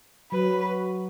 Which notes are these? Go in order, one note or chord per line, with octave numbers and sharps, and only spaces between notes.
F#3 B4